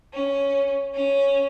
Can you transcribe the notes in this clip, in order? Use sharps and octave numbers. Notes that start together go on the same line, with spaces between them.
C#4
C#4